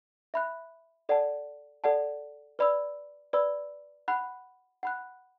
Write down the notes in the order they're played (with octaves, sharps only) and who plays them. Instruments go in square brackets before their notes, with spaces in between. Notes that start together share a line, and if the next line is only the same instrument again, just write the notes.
[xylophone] E5 B5 F#6
A4 D5 F#5 A5
A4 D5 F#5 A5
B4 D5 B5 E6
B4 D5 B5 E6
F#5 B5 F#6
F#5 B5 F#6